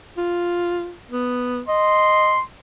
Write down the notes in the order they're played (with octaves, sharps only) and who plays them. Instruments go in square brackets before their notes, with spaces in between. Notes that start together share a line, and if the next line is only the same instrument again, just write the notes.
[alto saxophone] F4
B3
[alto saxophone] D#5 [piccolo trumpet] C6